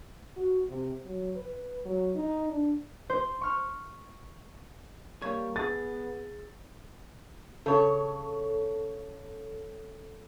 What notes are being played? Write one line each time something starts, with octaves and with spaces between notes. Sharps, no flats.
F#4
C3
F#3
B4
F#3
D#4
D4
C5
C#6 F6
G3 A#3 C#5
B3 G#4 A6
C#3 A4 C#5